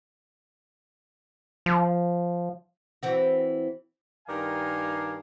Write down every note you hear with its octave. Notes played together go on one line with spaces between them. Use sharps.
F3
E3 C4 F#4
G2 D#3 A#4 D5 F5 G#5